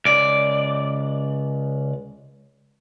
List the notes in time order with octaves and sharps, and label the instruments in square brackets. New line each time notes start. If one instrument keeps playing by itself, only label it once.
[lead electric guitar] C#2 D5